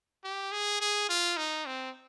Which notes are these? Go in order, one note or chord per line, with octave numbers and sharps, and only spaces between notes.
G4
G#4
G#4
F4
D#4
C4